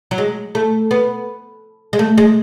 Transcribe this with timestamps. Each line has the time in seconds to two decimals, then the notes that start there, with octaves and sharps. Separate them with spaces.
0.11 F#3
0.18 G#3
0.55 A3
0.91 B3
1.93 G#3
1.99 A3
2.18 G#3